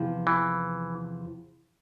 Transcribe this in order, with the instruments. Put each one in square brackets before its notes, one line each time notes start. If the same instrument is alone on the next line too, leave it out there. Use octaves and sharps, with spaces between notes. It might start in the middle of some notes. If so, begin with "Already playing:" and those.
Already playing: [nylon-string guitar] E2 C3 F3
[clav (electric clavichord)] E3